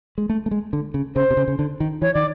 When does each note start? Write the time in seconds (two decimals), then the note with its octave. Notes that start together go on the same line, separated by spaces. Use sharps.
0.18 G#3
0.29 A3
0.46 A3
0.51 G#3
0.73 D3
0.94 C#3
1.16 C#3 C5
1.30 C3
1.37 C#3
1.48 C#3
1.59 D3
1.80 D#3
2.02 E3 C#5
2.14 D#3 D5